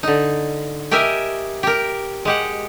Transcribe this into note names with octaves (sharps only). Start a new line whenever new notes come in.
D3 D#4
G4 A#4 D#5 E5 G#5
G4 A#4
G#3 G4 F#5